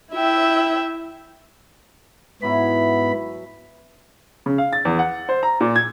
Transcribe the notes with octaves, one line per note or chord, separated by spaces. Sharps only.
E4 E5 G5
G#2 E3 F#3 B3 E4 B5
C#3
F5
A6
E2
F#5
C5
A#5
A#2
G#6